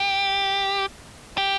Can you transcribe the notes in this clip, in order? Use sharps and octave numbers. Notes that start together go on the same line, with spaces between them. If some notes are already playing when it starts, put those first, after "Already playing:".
Already playing: G4
G4